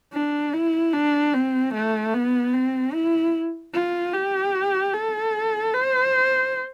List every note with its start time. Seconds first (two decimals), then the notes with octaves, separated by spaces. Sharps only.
0.13 D4
0.54 E4
0.93 D4
1.34 C4
1.74 A3
2.14 B3
2.54 C4
2.94 E4
3.74 F4
4.14 G4
4.94 A4
5.74 C5